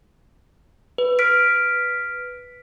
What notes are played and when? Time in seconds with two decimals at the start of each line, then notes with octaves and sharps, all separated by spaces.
0.98 B4
1.19 F6 B6 D7